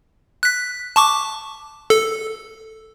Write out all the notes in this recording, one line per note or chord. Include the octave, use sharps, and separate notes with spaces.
F#6 B6
A5 C#6 D6
A4